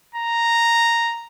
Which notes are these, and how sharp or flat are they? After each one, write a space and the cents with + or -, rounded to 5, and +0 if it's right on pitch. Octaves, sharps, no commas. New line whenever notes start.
A#5 -5